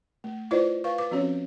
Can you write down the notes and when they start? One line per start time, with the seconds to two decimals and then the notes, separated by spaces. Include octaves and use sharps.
0.24 A3
0.51 E4 F4 B4 C5 D5 D#5
0.84 B4 F5 C#6
0.98 B4 D6
1.11 F3 C4 C#4 F#4 C#5